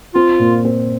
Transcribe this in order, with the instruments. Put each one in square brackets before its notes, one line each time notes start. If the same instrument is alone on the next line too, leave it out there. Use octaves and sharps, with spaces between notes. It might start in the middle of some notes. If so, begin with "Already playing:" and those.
[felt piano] C4 [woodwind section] F4
[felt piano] A#2
C4